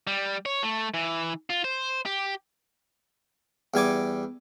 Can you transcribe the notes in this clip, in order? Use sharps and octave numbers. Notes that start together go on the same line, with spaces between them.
G3
C#5
A3
E3
F4
C5
G4
E2 G3 G#5 D6